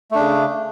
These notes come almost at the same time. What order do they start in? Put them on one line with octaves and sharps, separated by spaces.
A3 D4 C#3